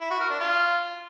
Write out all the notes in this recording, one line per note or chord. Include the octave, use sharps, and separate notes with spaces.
E4
F#4
A#4
D4
F4